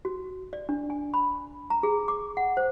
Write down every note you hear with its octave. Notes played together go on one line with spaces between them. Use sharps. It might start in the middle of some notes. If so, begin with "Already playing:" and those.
F#4
D5
D4
G#5
B5
A#5
G#4
D6
F#5
C5